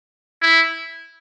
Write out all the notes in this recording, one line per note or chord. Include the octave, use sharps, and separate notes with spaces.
E4